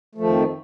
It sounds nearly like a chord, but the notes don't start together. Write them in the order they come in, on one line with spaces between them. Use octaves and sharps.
A3 F3 F2 D#3